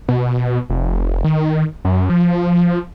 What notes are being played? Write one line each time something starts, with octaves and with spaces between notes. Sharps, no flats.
B2
F1
D#3
F#2
F3